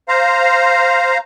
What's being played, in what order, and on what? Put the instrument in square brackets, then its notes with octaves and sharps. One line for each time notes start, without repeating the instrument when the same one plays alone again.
[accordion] C5 F5 A#5